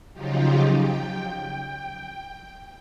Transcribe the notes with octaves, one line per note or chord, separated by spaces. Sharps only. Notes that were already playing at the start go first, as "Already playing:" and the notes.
C#3 F3 F#3 D#4 F4 G4
G5